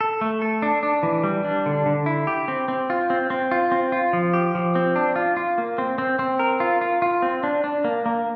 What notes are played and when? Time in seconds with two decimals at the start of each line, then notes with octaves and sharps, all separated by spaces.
0.01 A4
0.21 A3
0.42 A4
0.62 D4
0.83 D4
1.03 E3
1.24 G3
1.45 D4
1.66 D3
1.86 D3
2.06 E4
2.27 G4
2.48 C4
2.68 C4
2.90 F4
3.10 C4
3.30 C4
3.51 F4
3.72 C4
3.92 F4
4.13 F3
4.33 G4
4.55 F3
4.75 C4
4.96 D4
5.16 F4
5.37 F4
5.58 A#3
5.78 C4
5.98 C4
6.19 C4
6.39 A#4
6.60 F4
6.81 F4
7.02 F4
7.22 C4
7.43 D4
7.64 D4
7.84 A#3
8.06 A#3